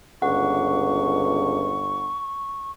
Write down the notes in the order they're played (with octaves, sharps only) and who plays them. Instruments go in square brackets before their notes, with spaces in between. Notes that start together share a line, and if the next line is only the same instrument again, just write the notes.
[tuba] G1 [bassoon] C#2 [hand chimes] F#5 [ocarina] C#6